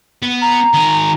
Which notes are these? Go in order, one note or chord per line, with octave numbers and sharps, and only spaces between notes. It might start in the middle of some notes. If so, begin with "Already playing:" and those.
B3
A#5
D#3 G#4